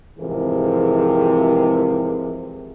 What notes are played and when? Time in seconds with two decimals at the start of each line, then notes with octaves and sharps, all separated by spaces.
0.18 G#2 C3 E3 F3 G#4 A#4